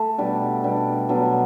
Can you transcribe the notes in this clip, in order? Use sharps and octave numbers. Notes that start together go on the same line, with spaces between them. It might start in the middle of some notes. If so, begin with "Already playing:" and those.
Already playing: A3
B2 G3 D4
B2 G3 D4
B2 F#3 B3 D4